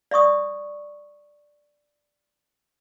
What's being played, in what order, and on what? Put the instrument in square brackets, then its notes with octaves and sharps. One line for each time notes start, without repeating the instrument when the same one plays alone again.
[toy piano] D5 E5 C#6 D#6